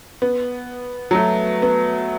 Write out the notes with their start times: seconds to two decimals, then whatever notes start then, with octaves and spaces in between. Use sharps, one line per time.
0.22 B3
1.11 F#3
1.15 A3
1.62 B3